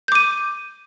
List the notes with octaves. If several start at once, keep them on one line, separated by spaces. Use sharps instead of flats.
D6 G6 D#7